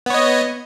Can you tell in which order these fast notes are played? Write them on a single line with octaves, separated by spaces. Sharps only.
B3 C#5 D#5